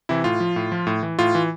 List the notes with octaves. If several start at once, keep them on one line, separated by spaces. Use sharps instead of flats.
C3 E3 E4
A2 F4
F3
A2
F3
A2
E3
A2 F4
E3